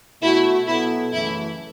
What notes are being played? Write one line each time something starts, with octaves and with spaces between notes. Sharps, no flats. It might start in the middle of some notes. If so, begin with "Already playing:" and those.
B2 A3 E4 F#4
B2 F#3 B3 E4 A4
F#2 C#3 E3 A3 E4